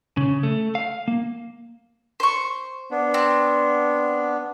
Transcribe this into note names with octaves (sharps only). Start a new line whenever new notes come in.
C#3
A3
F5
A#3
C5 C#6
B3 D4
C4